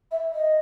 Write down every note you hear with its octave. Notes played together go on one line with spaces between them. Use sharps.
E5
D#5